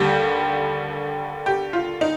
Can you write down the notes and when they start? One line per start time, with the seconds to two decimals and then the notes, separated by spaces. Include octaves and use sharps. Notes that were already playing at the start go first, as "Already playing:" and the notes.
Already playing: D#2 D3 G3 G4
1.46 G4
1.73 F4
2.01 D#4